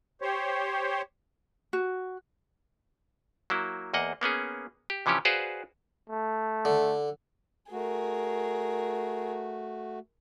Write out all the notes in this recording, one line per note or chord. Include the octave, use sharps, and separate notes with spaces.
G4 C5 C#5
F#4
F#3 A#3 E4
E2 A#3 D#5 F#5
A#3 B3 C#4 G#4
G4
C3 E3 F3 C#4 G4
F#4 G#4 B4 C5 D5 F5
A3
D3
A3 F#4 G#4 A#4